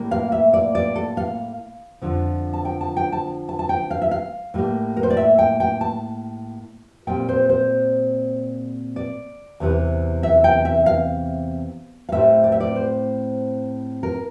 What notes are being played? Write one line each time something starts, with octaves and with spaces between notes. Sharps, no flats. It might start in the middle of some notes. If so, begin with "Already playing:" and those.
Already playing: A2 G3 A#3
F5
E5
D5
D5
A4
F5
F2 D3 F3
A5
G5
A5
G5
A5
A5
A5
G5
F5
E5
F5
A2 G3 A#3
A#4
C5
D5
E5
G5
G5
A5
A#2 G3 C4 G5
C5
C5
D5
E2 C3 E3
E5
G5
E5
F5
F5
A2 G3 C4 E5
D5
E5
D5
C5
A#4